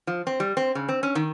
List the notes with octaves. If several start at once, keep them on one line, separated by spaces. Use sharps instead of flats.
F3
C4
G3
C4
C#3
C4
C#4
D#3